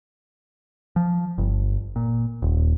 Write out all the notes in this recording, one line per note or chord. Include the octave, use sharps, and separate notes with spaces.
F3
G1
A#2
D#1